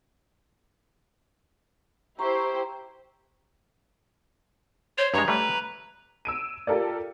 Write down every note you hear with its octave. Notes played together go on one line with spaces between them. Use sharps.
E4 G4 C5 A#5 C#6
C5 C#5
G2 G#3 C#5 A#5
G3 A3 B4
E6 D7 D#7
F4 G4 A4 A#4 D5